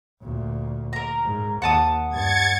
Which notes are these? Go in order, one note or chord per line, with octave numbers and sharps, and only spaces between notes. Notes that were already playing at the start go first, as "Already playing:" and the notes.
D2 A#2
A#4 A#5
G#2
D#2 F#5 A5 D#6
G2 G#6 A6 C#7